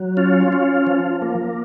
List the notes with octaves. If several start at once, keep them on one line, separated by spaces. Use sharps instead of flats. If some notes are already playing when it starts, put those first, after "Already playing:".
Already playing: F#3
C#4 F4
C#4
F3
A#3